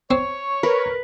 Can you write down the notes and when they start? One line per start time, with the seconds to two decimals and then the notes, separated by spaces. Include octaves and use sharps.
0.11 C4 C#5
0.63 A#4 B4